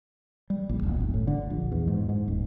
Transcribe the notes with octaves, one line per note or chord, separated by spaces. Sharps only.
G3
A#1
D#1
G1
A2
D3
A#1
E2
G#2
G#2
D#1